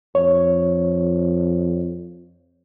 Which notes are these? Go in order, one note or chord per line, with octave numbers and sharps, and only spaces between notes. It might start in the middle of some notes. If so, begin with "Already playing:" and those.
F2 C#5